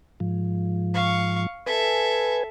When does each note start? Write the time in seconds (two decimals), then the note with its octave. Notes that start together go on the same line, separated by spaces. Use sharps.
0.20 G#2 F3
0.94 F5 C#6
1.66 A4 B4 E5 G#5